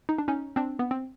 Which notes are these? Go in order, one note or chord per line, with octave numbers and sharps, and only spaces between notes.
D#4
D4
C#4 D#4
C4 D4
B3
C4